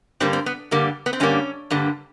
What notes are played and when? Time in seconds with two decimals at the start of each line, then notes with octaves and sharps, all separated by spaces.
0.20 G2 D3 G3 A#3 C4
0.33 C4
0.46 B3
0.71 G2 D3 G3 A#3
1.06 B3
1.13 C4
1.20 G2 D3 G3 A#3 C#4
1.70 G2 D3 G3 A#3